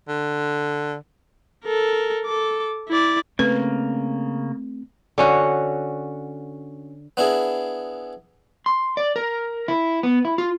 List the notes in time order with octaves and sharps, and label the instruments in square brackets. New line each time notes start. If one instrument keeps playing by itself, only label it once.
[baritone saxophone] D3
[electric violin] A4 A#4
A4 D6
E4 D5
[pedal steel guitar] C#3 A#3 [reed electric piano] A3 [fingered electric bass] C4 [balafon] B4
[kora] D3 C#4 F#4
[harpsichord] B3 D4 E4 G#4
[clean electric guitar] C6
D5
A#4
E4
B3
E4
F4